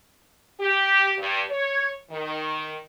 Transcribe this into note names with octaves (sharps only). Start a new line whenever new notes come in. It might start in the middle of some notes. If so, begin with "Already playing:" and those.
G4
G2
C#5
D#3